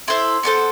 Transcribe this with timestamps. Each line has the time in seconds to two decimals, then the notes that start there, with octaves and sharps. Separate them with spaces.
0.08 E4 A4 C5 E5 C6
0.43 B3 D4 A4 C5